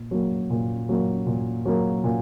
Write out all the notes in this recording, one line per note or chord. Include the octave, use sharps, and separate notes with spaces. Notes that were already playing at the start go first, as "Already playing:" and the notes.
Already playing: A#2
F#3 A#3
A#2
F#3 A#3
A#2
F#3 A#3
A#2